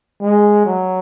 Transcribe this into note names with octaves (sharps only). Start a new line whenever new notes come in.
G#3
F#3